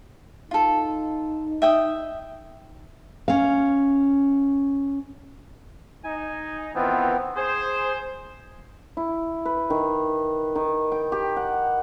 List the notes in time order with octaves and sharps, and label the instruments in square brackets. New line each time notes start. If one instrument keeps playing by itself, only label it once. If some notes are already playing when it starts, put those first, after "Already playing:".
[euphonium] D#4 [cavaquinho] F4 A4
[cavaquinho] E5 G5 D#6
[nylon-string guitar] C#4 F5
[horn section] D#4 [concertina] G#5
[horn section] D#3 E3 F4 [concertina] B3 C4
[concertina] G#4 [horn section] C5
[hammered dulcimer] E4
B4
D#3
D#3
G5
G4
F#5